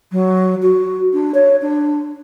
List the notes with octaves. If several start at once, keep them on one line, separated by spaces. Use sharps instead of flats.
F#3
F#4
D4
C#5
D4